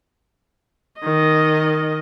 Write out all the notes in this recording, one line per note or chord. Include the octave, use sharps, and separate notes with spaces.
D#3 D#5